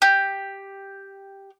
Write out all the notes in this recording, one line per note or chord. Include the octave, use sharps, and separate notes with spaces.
G4